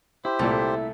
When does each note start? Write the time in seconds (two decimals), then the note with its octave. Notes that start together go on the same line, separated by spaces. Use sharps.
0.25 E4 G4 C5
0.39 C2 A#2 A3